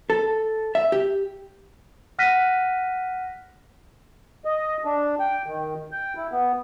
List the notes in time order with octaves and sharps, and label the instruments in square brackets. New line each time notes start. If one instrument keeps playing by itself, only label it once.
[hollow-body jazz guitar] A4
E5
G4
[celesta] F#5 F6 F#6 A#6 B6 D#7
[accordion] D#5
D4
G5
D#3
G5
E4
B3